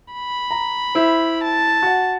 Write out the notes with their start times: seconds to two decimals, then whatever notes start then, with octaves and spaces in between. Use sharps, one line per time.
0.13 B5
0.51 A#5
0.95 E4 C5
1.44 A5
1.82 F#4 F#5